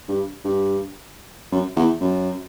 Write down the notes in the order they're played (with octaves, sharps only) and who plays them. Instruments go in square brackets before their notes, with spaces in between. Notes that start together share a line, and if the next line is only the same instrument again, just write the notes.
[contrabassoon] G2
G2
F#2
E2
F#2